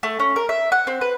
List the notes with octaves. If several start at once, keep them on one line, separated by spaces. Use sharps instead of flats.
A3
C#4
A#4
E5
F#5
C4
B4